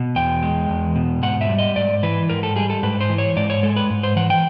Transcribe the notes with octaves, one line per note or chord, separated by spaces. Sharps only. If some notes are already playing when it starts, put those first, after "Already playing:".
Already playing: B2
E2 G5
G#3
E2
B2
G#2 F#5
E5
G3
D#5
G#2 D5
E3 B4
G#2 A#4
A4
G3 G#4
A4
G#2 B4
C5
E3
C#5
G#2 D5
C#5
G#3 A4
B4
G#2
C5
E3 F#5
G5